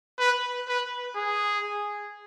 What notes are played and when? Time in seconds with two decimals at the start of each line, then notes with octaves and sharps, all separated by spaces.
0.19 B4
0.68 B4
1.16 G#4